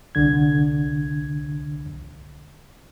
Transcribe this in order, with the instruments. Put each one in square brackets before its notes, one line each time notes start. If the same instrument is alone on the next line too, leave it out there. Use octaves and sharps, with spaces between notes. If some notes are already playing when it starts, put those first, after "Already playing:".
[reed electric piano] C2 D3 G#6